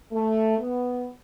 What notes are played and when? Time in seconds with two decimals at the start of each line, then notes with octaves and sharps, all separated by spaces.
0.11 A3
0.58 B3